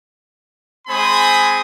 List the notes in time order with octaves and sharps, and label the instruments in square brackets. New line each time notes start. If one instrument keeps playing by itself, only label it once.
[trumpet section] G#3 C4 C5 G#5 B5 D#6